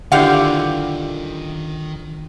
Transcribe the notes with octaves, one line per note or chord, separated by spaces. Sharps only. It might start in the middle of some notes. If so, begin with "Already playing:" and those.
D3 D#3 E4 F4 G4 D5 F5 F#5